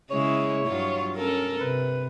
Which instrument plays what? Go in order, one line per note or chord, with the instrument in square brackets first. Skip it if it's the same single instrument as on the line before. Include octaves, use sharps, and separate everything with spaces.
[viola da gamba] C#3 G#3 E4 [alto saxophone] C#5
[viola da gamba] G2 F#3 F4
C#4 A4 A#4
[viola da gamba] C3 [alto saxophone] B4